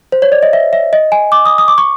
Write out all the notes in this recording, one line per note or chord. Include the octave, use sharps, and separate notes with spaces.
C5
C#5
D5
D#5
E5
E5
D#5
G#5
D6
D#6
D#6
D6
C#6